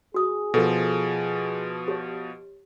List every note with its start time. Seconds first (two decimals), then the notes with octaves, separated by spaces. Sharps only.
0.14 F#4 G#4 D#6
0.54 B2 F3 A4
1.88 G4 C#5